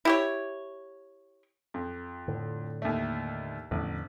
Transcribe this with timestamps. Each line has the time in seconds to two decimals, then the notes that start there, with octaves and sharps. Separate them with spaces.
0.05 E4 G4 C#5
1.74 F2
2.28 A2 D3
2.82 D#2 A3
3.71 A1 E2 D3 F3